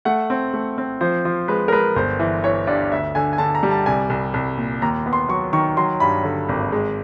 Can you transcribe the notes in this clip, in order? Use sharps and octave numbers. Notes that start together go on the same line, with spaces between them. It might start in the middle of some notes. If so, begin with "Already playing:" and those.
A3 F#5
C4
A3
C4
F3 C5
F3
G#3 B4
A#4
G#3 B4
G1 C5
E3
E3 C#5
G2 D5
D2 E5
D3 G#5
G#5
D3 A5
A#5
G3
A5
C2 G#5
C2
C2
A#2
D#2 A#5
B3
C6
F#3 C#6
D#3 C#6
F#3 C6
G2 B5
D3
G#1
G#3